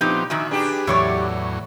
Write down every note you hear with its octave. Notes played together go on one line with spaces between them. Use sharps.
A#2 F3 B3 C4 D#4 G4
A#2 D#3 F#4 E5 G#5
D4 G4 G#4 B4
E2 A2 E3 F#3 C#5 D5